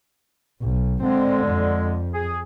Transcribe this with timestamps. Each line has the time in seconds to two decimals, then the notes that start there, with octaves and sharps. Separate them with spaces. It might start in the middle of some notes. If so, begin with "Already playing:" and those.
0.62 B1
1.03 D3 G#3 C4
1.48 F2
2.13 G#4